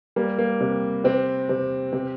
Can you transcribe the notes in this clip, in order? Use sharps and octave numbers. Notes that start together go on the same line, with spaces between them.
G3 A#3
A#3
C3
C3 C4
C3
C3